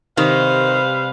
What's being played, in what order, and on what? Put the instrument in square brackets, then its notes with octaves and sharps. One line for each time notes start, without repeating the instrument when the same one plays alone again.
[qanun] C3 [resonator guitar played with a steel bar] D#3 [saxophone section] G3 B4 F5 [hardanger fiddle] C5